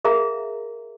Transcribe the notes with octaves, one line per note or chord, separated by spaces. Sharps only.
G#4 A#4 E5 F5 A#5